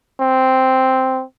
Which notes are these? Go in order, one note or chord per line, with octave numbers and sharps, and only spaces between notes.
C4